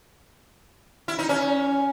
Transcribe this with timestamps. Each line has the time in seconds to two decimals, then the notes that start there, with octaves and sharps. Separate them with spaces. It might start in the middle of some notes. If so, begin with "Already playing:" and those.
1.08 E4
1.19 D#4
1.29 C#4